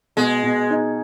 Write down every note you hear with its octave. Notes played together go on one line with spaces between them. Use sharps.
B2 G#3
B2
D#4